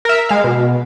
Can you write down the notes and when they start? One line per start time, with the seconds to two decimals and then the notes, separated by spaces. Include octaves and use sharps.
0.05 A#4 E5
0.29 G#3 F5
0.44 B2